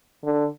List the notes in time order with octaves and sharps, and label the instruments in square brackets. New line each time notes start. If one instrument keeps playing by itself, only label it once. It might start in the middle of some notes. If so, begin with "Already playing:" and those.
[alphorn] D3